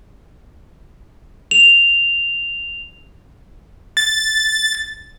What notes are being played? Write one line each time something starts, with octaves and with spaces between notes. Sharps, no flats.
F7
A6